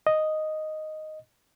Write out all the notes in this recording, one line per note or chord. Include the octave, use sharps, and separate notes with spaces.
D#5